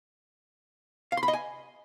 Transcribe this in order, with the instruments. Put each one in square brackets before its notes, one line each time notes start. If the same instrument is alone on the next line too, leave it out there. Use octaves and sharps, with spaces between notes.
[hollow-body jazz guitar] F5
C6
B5
D#5
G#5